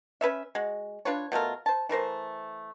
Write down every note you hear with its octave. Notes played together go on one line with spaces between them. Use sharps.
C#4 B4 C#5 E5
G#3 F#4
D4 F4 B4 C#5
B2 A3 F4 A#4
C5 A5
E3 A3 A#4 C5